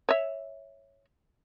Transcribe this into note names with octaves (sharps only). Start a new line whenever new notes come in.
C#5 E5